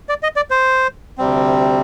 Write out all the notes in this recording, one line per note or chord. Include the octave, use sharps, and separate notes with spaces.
D5
D#5
D5
C5
D2 C3 G3 C4